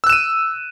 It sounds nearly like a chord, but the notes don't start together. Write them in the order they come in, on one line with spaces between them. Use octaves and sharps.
E6 F#6 E7 D#7